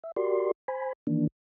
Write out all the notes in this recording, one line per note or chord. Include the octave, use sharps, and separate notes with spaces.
E5
F#4 G4 A#4 D5 C6
C5 G#5 B5
D#3 E3 A#3 D4